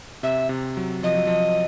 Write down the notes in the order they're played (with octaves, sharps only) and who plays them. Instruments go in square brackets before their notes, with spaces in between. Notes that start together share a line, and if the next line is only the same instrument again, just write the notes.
[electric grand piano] C3 [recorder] E5
[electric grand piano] C3
F#3
[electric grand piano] F3 [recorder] D#5
[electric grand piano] F#3
F3